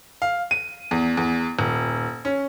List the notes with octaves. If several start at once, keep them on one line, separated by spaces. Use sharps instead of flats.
F5
D#7
E2
E2
D#1
C#4